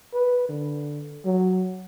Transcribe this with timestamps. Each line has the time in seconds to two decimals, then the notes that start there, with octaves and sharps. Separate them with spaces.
0.14 B4
0.49 D3
1.25 F#3